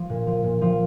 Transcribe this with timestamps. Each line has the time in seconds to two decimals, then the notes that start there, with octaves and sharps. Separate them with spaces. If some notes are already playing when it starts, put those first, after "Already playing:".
Already playing: F3
0.09 A#2
0.26 F3
0.44 A#2
0.61 F3